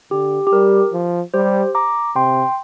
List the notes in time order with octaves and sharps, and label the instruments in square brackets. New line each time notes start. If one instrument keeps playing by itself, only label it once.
[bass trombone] D3 [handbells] G4
[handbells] G4
[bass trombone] G3 [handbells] A#4
[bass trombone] F3
[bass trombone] G3 [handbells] G4 C5
[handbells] A#5 D6
[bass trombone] C3 [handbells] G5 C6